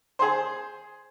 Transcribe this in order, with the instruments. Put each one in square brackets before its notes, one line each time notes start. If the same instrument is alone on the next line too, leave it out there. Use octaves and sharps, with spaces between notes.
[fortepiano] G#4 C5